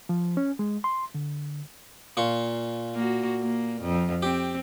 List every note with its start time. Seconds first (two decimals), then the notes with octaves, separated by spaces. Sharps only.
0.09 F3
0.37 C#4
0.59 G#3
0.84 C6
1.14 D3
2.17 A#2 F4 C#6
2.95 A#3 F#4
3.42 A#3
3.82 F2
4.23 C4 G4